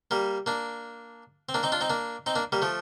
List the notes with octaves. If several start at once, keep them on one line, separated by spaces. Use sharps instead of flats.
G3 A#3
A#3 D4
C4
A#3 D4
C4 D#4
D4 F4
C4 D#4
A#3 D4
C4 D#4
A#3 D4
G3 A#3
F3 A3